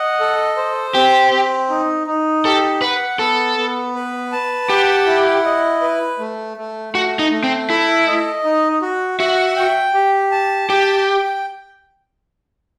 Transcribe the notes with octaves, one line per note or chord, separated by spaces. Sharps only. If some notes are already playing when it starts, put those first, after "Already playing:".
Already playing: D#5 F#5
A4
C5
C4 G4
C4
D#4
D#4
G4 A4
B4 F#5
B3 A4
B3
B4
A5
G4 F#5
E4
D#5
B4
A3
A3
A3 F#4
D#4
A3
C4
E4 A4
D#5
D#4
F#4
F#4 E5
G5
G4
A5
G4 G5